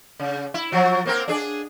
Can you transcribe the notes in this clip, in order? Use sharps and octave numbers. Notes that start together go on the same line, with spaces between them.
C#3
E4
F3 F#3
A#3 C4 A#4
D4 G#4 D5